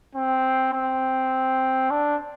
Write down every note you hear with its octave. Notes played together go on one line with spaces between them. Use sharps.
C4
C4
D4